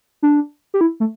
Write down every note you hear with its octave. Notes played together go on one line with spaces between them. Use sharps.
D4
G4
E4
A3